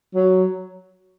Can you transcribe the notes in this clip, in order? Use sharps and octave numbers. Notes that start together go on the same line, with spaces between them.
F#3